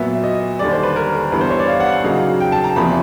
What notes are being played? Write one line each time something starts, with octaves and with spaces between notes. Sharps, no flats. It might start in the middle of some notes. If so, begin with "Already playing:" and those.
Already playing: A#2 F#3 B3 E5
D#5
D#2 D3 G3 D5
C5
B4
A#4
G2 E3 G3 B3 B4
C5
C#5
D5
F5
F#5
C#3 F#3 A#3 D#4 F5
G5
A5
A#5
E2 C3 F3 A#3 B5